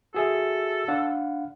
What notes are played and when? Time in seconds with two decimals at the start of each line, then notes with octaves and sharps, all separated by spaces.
0.15 F#4 G#4 A4 E5
0.88 D4 F5 F#5